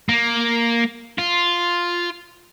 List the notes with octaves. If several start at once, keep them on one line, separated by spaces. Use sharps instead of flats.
A#3
F4